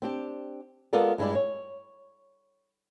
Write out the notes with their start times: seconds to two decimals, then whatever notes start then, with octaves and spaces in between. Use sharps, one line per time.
0.02 C4 D4 G4
0.93 G#3 B3 F4 A4 A#4 D5
1.18 G2 G#3 E4 D5
1.35 C#5